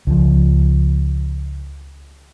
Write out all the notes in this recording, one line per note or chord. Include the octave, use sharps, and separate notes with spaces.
C#2 F3